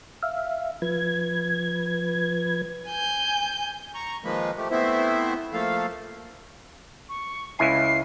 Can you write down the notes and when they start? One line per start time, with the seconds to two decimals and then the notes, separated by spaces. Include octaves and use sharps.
0.23 E5 F5
0.82 F3 B4 G#6
2.88 G#5 G6
3.94 A#5 C#6
4.24 D#3 F3 G#3 A#3 B4
4.57 F3 A3 G4
4.71 A3 B3 C4 E4 C5 E5
5.53 F3 A3 A#3 A4 F5
7.09 C#6
7.59 C#2 E4 G#5 C7